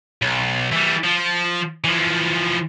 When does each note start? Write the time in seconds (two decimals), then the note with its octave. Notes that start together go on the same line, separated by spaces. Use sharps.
0.22 B1
0.72 E3 G3
1.04 F3
1.84 E3 F3